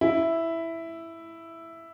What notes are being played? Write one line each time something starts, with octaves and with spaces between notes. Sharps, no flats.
E4